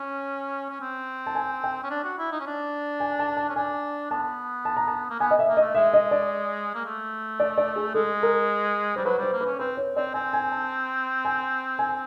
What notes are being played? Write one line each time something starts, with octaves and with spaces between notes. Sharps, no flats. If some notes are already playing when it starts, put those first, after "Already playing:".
Already playing: C#4
C#4
C4
A5
G#5
G5
C#4
D4
F#4
E4
D#4
C#4
D4
G#5
A5
A5
C#4
D4 G#5
B3 A5
A5
A#5
A5
A#3
B3 G#5
D#5
E5
A#3
D#5
A3
G#3 E5
D#5
D5
A#3
A3
D5
D5
G#4
G#3 A4
A#4
G3 C5
F#3 B4
G3 C5
A#3
B4
C#4
C4 B4
C#5
C4 D5
C4 G#5
G#5
A5
G#5
G#5